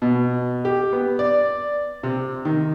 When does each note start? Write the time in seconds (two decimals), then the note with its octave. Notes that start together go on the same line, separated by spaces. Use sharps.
0.02 B2
0.65 G4
0.93 B3
1.19 D5
2.03 C3
2.45 D#3